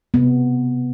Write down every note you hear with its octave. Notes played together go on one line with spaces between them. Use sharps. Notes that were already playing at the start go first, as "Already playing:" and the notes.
C3 B3